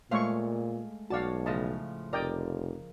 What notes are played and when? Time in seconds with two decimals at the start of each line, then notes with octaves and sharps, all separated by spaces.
0.11 A#2 G#3 A3 C5 C#5 F5 C#6
1.10 B1 F#4 C#5 D5 F5 A5
1.46 A2 C#3 F3 D#5 A5
2.13 F1 A#4 D5 D#5 G5